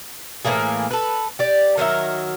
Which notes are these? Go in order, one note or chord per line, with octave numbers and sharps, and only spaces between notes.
A2 E3 A#3 G#4
A4 B4
G4 D5
D#3 F#3 A#4 E5